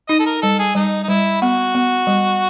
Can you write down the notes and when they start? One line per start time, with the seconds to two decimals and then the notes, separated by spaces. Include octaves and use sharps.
0.09 D#4 D#5
0.19 A4
0.26 A#4
0.42 G3 A4
0.59 G#4
0.75 G3 D#4
1.04 D#4
1.08 G3 E4
1.42 B3 F#4
1.75 B3
2.07 G3